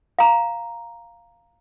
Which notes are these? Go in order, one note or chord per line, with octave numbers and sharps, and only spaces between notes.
F5 A#5